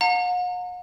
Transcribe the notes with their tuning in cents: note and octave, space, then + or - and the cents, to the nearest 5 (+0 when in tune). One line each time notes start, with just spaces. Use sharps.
F#5 -45 A#5 -35